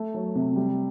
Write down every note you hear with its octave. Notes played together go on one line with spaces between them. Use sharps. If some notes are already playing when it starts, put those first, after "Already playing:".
Already playing: A3
F#3
C3
G3